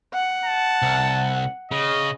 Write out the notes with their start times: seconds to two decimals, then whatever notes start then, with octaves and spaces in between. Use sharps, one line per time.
0.13 F#5
0.45 A5
0.82 C2
1.71 C#3 D#5